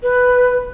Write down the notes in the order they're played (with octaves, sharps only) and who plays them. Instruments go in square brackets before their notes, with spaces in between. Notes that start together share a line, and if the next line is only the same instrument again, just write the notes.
[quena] B4